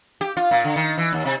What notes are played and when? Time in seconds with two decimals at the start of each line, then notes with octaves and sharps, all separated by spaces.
0.21 G4
0.37 F4
0.51 A#2
0.64 D3
0.76 D#3
0.98 E3
1.13 D#2
1.25 C3